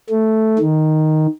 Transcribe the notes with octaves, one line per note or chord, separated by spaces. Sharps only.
A3
D#3